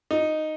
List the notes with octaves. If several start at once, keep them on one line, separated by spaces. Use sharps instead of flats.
D#4